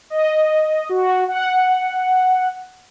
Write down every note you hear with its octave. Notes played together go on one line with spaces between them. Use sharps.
D#5
F#4
F#5